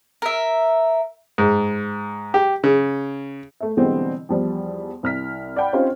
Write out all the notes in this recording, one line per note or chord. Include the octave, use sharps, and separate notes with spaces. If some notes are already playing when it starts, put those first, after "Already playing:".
A#4 E5
G#2
G4
C#3
A3 E5
B2 D3 E3 G3 G#3 C4
E2 F3 G3
C2 F6 B6
D5 F#5 G5 B5
C4 C#4 D#4 F4 G4 C5